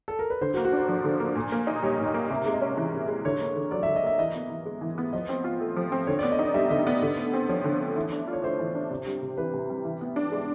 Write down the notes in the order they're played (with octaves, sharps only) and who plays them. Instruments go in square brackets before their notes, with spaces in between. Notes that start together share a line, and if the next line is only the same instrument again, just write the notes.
[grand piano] A4
A#4
B4
[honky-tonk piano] D3 [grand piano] C5
[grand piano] F#4
[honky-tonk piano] A#3
[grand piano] F#4
[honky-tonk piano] D4 [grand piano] C5
[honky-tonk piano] F3
D3
A#3
A#2
A#3
D#4
[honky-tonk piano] G3 [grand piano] C#5
[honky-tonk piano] A#2
[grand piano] D#5
[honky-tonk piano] A#3
[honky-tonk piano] C3 [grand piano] E5
[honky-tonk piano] G#3
[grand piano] D#5
[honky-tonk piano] C#4
E3
C3
G#3
[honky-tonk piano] D3 [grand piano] C#5
[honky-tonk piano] A#3
D3
[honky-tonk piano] F#3 [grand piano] D5
[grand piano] E5
[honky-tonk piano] D3
[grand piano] D#5
[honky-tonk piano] A#3 [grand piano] E5
[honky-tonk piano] E3 [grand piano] D#5
[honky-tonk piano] B3
E3
G#3
E3
B3
[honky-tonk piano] F3 [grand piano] D#5
[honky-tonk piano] C4
F4
A3
F3
C4
[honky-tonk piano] D3 [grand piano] C#5
[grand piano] D5
[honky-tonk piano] B3
[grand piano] D#5
[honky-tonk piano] D#4 [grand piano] D5
[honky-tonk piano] G3 [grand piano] E5
[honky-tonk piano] D3 [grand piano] D#5
[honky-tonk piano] B3 [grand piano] D5
[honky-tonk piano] D3
A3
C4
[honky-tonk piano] F3 [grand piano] C#5
[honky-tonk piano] D3
A3
E3
D4
F4
[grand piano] C#5
[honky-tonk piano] A3 [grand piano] C5
[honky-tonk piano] E3
D4
C3
G3
C3
[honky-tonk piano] E3 [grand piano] B4
[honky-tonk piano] C3
G3
E3
B3
D4
G#3